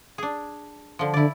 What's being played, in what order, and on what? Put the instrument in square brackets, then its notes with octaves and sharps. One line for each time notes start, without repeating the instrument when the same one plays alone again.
[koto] D4 G#4
D3 F3
[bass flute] D3 [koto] E4 D5